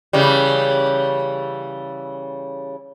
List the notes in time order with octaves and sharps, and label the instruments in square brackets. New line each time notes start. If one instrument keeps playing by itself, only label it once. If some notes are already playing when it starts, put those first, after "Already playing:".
[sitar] C#3 E3 G3